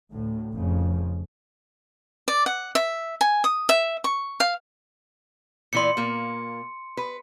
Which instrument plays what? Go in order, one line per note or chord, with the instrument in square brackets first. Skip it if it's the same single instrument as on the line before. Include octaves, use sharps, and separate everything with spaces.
[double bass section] D2 A2
F1 F2 C#3 F3
[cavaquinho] D5
F#5
E5
G#5
D#6
E5
C#6
F5
[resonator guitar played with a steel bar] A#2 E3 D5 [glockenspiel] C6 C#7
[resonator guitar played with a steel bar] A#2 A#3
B4